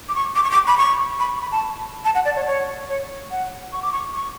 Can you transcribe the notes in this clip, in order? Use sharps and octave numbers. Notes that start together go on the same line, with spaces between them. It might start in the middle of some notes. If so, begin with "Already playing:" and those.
D6
C#6
D6
C#6
D6
B5
C#6
B5
C#6
B5
A5
A5
F#5
D5
C#5
C#5
C#5
F#5
C#6
D6
C#6
C#6